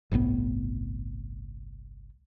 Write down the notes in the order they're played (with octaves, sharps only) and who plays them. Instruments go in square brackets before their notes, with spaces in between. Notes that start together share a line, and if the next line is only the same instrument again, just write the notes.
[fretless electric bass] G1 C2 A2 B3